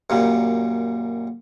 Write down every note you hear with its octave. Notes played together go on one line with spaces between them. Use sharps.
F#2 A#2 G3